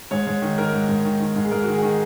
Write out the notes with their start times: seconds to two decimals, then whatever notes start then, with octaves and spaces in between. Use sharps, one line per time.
0.11 G#2 C#5
0.27 G#2
0.42 D#3
0.58 D#3 A#4
0.73 G#2
0.89 G#2
1.05 D#3
1.20 D#3
1.36 G#2
1.44 G#4
1.51 G#2 A#4
1.63 D#3 F#4
1.74 G#4
1.82 D#3